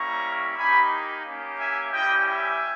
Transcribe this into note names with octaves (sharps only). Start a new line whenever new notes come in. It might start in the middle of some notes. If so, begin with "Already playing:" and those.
Already playing: G3 A#3 C#4 E4 A#5 C#6
A#3 D#4 G4 G#5 B5
A#3 C#4 G4
E5 G#5
G3 C#4 E4 G4 D#5 G5
E5 G#5